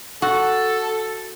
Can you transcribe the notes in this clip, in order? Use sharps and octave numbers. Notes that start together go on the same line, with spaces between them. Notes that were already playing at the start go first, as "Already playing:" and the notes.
F#4 A4